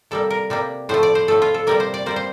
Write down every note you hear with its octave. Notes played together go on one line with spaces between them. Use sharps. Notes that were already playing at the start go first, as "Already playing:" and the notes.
C3 G3 A#3 A4
A#4
C3 G3 A#3
A2 F3 A3 C5
D5
C5
A2 F3 A3 A4
F4
A4
C3 G3 A#3 A#4
C5
D5
C3 G3 A#3 C5
C5